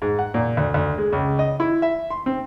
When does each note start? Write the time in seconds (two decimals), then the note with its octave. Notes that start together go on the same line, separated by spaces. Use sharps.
0.02 G#2
0.19 F#5
0.34 A#2
0.57 D2
0.74 D2
0.98 G#3
1.13 C#2
1.39 D#5
1.60 E4
1.82 E5
2.10 C6
2.26 C4